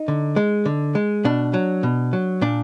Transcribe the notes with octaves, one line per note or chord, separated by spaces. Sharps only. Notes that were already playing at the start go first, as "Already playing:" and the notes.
Already playing: D#4
D3
G#3
D3
G#3
B2 D4
F#3
B2
F#3
A#2 D4